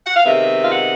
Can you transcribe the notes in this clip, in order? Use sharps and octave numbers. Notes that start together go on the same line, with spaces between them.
F#5
F5
C3 D#3 G#3 B3 E5
F5
F#5